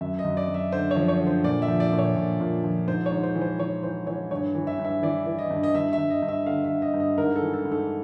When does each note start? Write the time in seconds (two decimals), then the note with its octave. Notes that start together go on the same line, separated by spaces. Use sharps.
0.01 F#2 E5
0.19 D#5
0.25 F#2
0.37 D5
0.49 F#2
0.54 E5
0.72 D3 C5
0.91 C#5
0.96 F3
1.08 C#5
1.20 D3
1.27 C5
1.44 A#2 D5
1.62 E5
1.68 F3
1.80 D5
1.92 A#2
1.98 C#5
2.16 A#2
2.40 A#2
2.64 F3
2.88 G#2 C5
3.06 C#5
3.12 G#2
3.23 C5
3.35 E3
3.41 C5
3.59 E3 C#5
3.83 E3 C5
4.07 E3 C#5
4.31 G2 C#5
4.55 E3
4.67 E5
4.79 G2
4.85 E5
5.03 E3 D5
5.26 E3
5.39 D#5
5.51 G2
5.63 D#5
5.75 G2 E5
5.93 E5
5.98 G2
6.10 D#5
6.22 G2
6.28 E5
6.46 D3 F5
6.64 E5
6.70 D3
6.82 D#5
6.94 G2
7.00 D#5
7.18 G#2 A#4
7.36 A4
7.42 E3
7.54 A4
7.65 G#2
7.72 A4